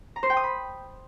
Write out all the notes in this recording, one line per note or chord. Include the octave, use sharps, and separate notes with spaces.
A#5
C5
G5
D#6
B5